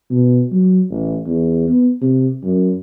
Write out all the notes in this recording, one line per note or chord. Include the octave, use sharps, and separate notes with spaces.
B2
F#3
A1
E2
B3
C3
F#2